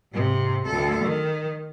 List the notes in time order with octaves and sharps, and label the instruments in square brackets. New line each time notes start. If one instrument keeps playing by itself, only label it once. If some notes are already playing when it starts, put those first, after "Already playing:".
[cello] G#2 C3
D2 A4
D#3